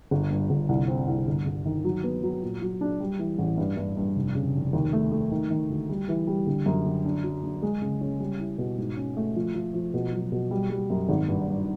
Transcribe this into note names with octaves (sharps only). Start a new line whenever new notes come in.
G1
G2
G1
C2
C4
C2
G1
G1
D#3
F#3
B3
F#3
A#2
F#3
D4
G3
E3
A1
G2
G2
G2
F1
C#3
F1
D#2
A3
A3
D#3
D#3
D2
G3
E3
G3
D3
F#2
D3
D4
F#3
D4
G#3
C#3
C#4
G3
E4
B2
G#2
C#4
A3
F3
F3
F3
B2
F#3
B2
G3
G3
F#2
G#1
G2
G2